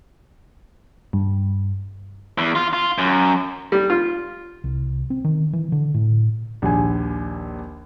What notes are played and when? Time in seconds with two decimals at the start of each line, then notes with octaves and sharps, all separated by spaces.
1.13 G2
2.38 E2
2.55 F4
2.73 F4
2.98 F#2
3.72 G3
3.90 F4
4.64 C2
5.10 C4
5.24 D#3
5.53 E3
5.72 D3
5.94 A2
6.62 A#1 D#2 G#5